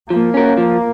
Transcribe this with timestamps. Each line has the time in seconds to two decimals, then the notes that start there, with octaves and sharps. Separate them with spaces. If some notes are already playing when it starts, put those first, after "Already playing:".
0.10 F3 A#3
0.34 C#4 A#4
0.58 F3